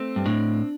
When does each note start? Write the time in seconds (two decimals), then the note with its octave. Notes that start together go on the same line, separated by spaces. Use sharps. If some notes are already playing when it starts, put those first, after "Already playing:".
Already playing: A3 C4
0.16 G2
0.26 A2 D4